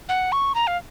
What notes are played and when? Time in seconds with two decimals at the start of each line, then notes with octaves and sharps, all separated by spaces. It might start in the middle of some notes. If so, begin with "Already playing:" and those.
0.09 F#5
0.32 C#6
0.55 A#5
0.67 F5